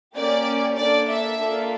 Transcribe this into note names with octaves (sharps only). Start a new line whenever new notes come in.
A#3 C#4 G4 D5
A#3 D4 A4 D5
E5
A#3 D4 F4 A4